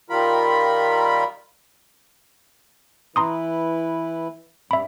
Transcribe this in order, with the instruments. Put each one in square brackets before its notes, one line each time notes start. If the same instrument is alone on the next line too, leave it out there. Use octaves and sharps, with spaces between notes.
[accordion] D#3 G3 F4 A#4 B5
[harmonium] E3 E4 B4 [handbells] A#5 C6 D#6
[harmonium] G2 G3 [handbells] E5 B5